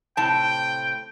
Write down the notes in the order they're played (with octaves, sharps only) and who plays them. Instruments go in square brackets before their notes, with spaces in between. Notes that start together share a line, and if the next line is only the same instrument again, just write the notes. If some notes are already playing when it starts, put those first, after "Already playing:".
[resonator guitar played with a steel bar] A2 C3 A5 [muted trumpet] G5